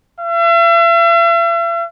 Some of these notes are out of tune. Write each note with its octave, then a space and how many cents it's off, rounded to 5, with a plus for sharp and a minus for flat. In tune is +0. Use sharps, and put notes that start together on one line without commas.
E5 +45